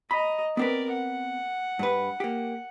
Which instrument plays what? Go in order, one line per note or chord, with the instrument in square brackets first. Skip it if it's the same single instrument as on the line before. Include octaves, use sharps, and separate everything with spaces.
[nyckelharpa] D#5 A#5 [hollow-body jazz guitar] B5
[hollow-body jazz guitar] B3 C4 B4 [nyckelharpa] A#4 D5
[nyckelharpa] F#5
[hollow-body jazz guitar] G2 B4
A#3 G4